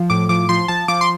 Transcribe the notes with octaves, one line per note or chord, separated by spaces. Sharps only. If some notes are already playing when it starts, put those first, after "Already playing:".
Already playing: F3
A2 D6
F3 D6
F3 C6
F3 A5
F3 D6
C6